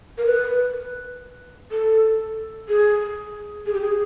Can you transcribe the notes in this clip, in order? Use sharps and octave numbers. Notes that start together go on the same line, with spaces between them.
A#4
B4
A4
G#4
G#4
G4
G#4